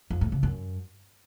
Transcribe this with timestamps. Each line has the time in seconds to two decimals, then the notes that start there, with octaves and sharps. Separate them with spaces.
0.10 F2
0.21 A2
0.32 C#3
0.43 F#2